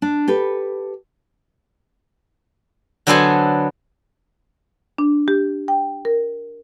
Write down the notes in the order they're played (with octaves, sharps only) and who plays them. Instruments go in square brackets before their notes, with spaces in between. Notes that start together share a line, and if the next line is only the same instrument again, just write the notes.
[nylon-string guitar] D4
G4 A4 B4
[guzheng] D3 F#3 B3 A4 C5 G#5
[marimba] D4
G4
G5
A#4